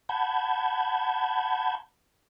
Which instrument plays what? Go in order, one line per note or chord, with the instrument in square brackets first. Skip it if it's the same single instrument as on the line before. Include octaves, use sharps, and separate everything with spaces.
[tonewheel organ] F#5 A5 B5 G6 G#6